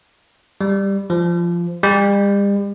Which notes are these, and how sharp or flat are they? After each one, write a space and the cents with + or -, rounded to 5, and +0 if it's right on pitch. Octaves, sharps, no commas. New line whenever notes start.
G3 +10
F3 -15
G3 +40